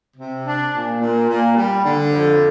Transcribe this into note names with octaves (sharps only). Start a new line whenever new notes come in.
C3
D4
A#2
A#2
A#2
G3
D3
F2